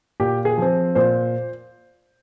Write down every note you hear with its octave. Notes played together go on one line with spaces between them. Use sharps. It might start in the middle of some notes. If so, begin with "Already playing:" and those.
A#2 G4
G#4
F3 C4
A#2 C5